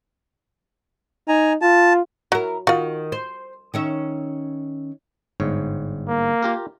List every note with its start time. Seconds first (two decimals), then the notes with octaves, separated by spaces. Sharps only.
1.28 D#4 G#5 A#5
1.62 F4 A5
2.32 F#3 E4 A#4
2.67 D#3 F4 F#4
3.12 C5
3.74 D#3 C#4 E5
5.40 G1 G#2 C#5
6.08 A#3
6.43 F4 G4 A#4